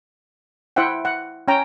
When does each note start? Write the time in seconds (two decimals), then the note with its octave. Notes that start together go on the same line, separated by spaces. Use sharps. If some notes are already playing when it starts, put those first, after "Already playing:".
0.76 E4 C5 E5 F#5 G5
1.05 F#5
1.48 C#4 C#5 G5 A#5